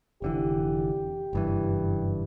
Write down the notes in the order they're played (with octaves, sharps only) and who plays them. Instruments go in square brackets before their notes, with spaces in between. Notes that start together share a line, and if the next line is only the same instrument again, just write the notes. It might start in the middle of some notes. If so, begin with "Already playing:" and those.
[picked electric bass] F1 D3 E3 [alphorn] G4
[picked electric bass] F#1 G2 E3